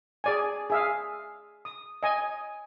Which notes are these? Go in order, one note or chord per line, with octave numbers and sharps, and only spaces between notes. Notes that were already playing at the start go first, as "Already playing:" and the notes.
G#4 D5 G#5
G#4 E5 F5
D#6
D#5 G#5